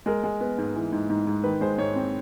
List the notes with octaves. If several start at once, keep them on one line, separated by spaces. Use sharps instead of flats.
G#3 A#4
G#3
B3
G#2
E3
G#2
G#2
G#2
D#3 B4
G#3 C5
G#2 C#5
C4